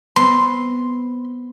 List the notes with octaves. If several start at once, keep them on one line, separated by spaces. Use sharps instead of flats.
B3 C4 C6